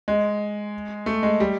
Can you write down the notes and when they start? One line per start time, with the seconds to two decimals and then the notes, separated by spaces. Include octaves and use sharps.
0.08 G#3
1.06 A3
1.23 G#3
1.40 G3